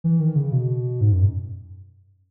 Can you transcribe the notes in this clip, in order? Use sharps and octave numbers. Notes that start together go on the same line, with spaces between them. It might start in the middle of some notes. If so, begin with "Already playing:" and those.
E3
D#3
C#3
B2
G#2
F#2